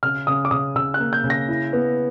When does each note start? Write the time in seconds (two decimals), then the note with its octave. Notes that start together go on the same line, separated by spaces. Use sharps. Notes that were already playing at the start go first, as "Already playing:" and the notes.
0.03 C#3 F6
0.27 C#3 D#6
0.45 D6
0.51 C#3 D#6
0.75 C#3 E6
0.94 F#6
1.00 A#3
1.13 G6
1.24 C#3
1.30 A#6
1.48 E4
1.73 B3